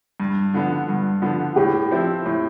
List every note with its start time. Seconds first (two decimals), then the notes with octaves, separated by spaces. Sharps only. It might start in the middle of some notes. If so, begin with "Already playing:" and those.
0.20 G2
0.54 D3 F3 B3
0.89 G2
1.22 D3 F3 B3
1.56 A2 G4
1.91 F3 C4 E4
2.26 A2